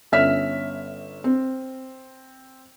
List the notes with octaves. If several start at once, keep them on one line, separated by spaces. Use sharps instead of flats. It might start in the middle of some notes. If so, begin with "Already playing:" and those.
G1 C#4 E5 F6 B6
C4